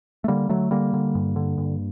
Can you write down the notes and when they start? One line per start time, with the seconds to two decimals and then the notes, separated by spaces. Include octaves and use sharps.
0.24 A3
0.28 D3 G3 A#3
0.49 D3 F#3 A3
0.71 D3 G3 A#3
0.93 D3
1.15 G2
1.36 D3
1.58 G2